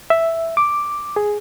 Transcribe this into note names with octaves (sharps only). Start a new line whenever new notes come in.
E5
D6
G#4